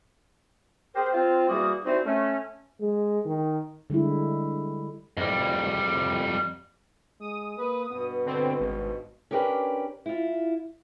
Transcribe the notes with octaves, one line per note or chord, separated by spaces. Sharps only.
C4 G4 G#4 A#4 C5
C4 F4
E2 E3 G3 A#3 F#4 D#6
E3 G3 C4 D#4 F#4 C5
A3 C#4
G#3
D#3
D3 G3 G#3 E4
F2 G3
G#3 D#6
A#3 B4
G2 B2 B3
D3 C4
G#1
C#4 D4 G4 A#4 B4 D5
E4 F4